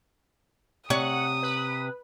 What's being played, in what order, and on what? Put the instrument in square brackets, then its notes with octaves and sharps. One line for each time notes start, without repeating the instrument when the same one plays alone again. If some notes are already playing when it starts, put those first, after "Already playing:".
[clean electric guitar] C3 [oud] C#5 [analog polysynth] F#5 [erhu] D#6
[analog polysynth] B4